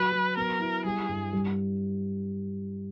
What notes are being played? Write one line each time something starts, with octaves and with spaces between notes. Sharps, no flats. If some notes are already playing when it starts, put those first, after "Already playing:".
Already playing: F#3 B4
F#3
B3 A#4
E4
G3 G#4
G2
G3